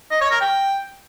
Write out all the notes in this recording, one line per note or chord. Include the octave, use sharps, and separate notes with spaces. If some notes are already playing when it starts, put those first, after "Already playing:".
D#5
C#5
A#4
G5